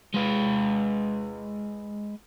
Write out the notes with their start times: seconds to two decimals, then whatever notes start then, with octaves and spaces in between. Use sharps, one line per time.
0.15 G#3 B4